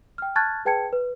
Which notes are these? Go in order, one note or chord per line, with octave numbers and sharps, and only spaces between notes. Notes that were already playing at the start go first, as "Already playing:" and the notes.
G5 F6
A5 C#6 F6 F#6 G#6 A6
G#4 B4 G5 A5 G#6 C#7
B4